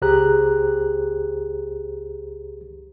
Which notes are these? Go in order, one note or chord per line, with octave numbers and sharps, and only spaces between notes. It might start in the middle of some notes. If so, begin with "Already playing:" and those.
C#2 G4 G#4 C5 A#5 F#6